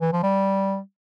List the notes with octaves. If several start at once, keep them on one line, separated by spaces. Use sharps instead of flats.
E3
F3
G3